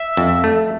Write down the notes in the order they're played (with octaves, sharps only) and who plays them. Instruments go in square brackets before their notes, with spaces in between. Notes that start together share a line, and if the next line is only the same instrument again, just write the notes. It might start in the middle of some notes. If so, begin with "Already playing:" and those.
Already playing: [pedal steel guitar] E5
[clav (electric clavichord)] F2
A3